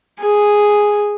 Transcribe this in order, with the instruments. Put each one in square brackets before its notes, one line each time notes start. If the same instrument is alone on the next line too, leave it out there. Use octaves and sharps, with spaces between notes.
[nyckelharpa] G#4